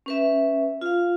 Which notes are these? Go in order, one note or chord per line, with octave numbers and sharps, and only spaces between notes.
C#4 B4 E5
F4 F5